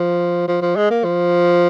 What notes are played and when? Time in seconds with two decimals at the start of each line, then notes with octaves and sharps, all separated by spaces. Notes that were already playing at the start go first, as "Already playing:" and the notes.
Already playing: F3
0.48 F3
0.62 F3
0.76 G#3
0.90 A#3
1.04 F3